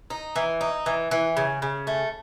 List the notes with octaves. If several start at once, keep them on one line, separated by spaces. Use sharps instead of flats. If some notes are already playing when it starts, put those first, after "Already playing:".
D#4
E3
D#4
E3
E3
C#3
C#3
A3